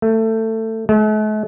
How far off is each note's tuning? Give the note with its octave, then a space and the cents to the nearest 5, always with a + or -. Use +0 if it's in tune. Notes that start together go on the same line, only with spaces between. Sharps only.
A3 +20
A3 -45